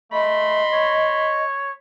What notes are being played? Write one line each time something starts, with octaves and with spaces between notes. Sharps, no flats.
A3 D#5 B5 C6
C#5